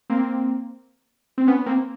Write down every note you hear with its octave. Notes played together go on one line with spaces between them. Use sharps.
A#3 C4
C4
B3 C#4
A#3 C4